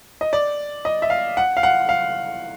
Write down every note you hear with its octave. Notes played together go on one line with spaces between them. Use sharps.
D#5
D5
D#5
E5
F5
F#5
F5
F#5
F5